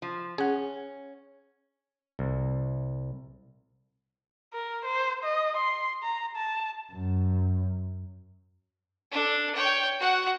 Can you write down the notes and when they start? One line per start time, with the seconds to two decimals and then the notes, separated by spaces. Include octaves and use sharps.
0.02 F3
0.38 C#4 G#4 F#5
2.19 C2
4.54 A#4
4.85 C5
5.24 D#5
5.57 C6
6.03 A#5
6.37 A5
6.93 F#2
9.11 D4 A4
9.55 C#5 G5
9.99 F#4 F#5